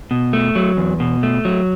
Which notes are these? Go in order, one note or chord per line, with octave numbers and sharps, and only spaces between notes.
B2
A3
F#3
E2
B2
A3
F#3